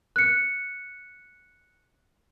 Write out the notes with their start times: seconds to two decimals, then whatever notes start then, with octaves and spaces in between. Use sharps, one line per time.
0.16 F#6 C#7